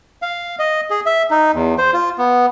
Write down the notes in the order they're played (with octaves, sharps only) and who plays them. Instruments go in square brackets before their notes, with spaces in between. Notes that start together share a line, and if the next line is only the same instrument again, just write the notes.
[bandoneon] F5
D#5
G#4
E5
D#4
E2
C5
F4
B3